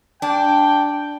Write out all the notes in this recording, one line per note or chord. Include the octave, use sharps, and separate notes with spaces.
D4 G5